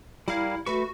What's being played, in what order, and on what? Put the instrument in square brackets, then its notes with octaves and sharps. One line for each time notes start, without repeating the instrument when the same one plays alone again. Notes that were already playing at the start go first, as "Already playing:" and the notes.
[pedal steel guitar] G3 A#4 F5 [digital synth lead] E4
[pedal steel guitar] A3 B4 C#6 [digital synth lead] F#4